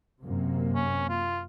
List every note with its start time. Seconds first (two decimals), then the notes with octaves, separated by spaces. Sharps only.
0.21 F#2 C3 A#3
0.75 C#4
1.09 F4